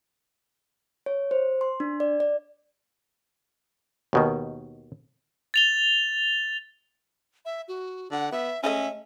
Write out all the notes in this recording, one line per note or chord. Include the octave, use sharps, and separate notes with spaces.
C#5
C5
C6
D4
D5
D5
D#2 B2 D#3
A6 F7 G7
E5
F#4
D3 F#5
B3 E5
G#3 A3 C#4 D#5 E5